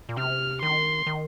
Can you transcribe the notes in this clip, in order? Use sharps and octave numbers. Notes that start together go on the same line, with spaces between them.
A#2
C3 F6
D#3 C6
D#3